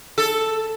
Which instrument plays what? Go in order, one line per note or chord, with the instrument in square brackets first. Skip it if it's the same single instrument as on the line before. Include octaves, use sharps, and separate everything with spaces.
[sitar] A4